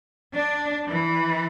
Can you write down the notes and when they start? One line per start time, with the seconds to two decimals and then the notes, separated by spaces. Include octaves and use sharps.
0.35 D4
0.89 E3